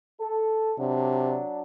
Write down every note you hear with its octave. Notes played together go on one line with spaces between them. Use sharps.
A4
C3 F#3 D4